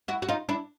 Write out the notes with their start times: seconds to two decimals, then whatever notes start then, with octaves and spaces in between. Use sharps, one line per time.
0.08 E4 F#4
0.22 F#4
0.29 D#4 F4
0.49 D4 E4